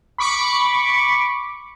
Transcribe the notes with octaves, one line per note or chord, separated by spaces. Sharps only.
B5 C#6 D6